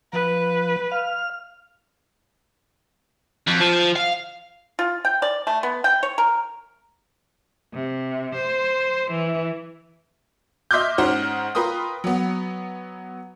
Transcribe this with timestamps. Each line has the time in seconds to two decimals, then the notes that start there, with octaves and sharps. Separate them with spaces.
0.13 F3 B4
0.91 F5 F6
3.47 F2
3.60 F3
3.96 F5
4.79 F4
5.05 G5
5.22 D5
5.47 A3
5.63 B3
5.84 G5
6.03 C#5
6.18 A#4
7.73 C3
8.34 C5
9.10 E3
10.71 D#5 E5 C6 D6 F6 G6
10.98 G#2 C#4 D#4 C5 F#5 F6
11.55 F4 A#4 B4 G5 C6 D#6
12.04 F#3 B3